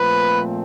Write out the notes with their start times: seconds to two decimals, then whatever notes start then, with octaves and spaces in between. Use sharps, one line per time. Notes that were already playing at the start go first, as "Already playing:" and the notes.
Already playing: A#2 F3 A3 C4 B4